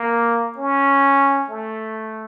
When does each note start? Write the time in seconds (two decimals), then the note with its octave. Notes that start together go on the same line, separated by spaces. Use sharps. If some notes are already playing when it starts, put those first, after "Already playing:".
Already playing: A#3
0.58 C#4
1.50 A3